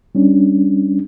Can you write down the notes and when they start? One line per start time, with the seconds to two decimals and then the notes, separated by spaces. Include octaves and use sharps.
0.15 G3 C#4 D4